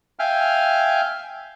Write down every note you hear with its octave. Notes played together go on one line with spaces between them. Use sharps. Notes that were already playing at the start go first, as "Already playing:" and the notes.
E5 F5 G5 G#5 F6